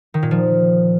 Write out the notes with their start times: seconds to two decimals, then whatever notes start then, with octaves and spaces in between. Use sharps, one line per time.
0.14 D#3
0.23 A#2
0.31 F3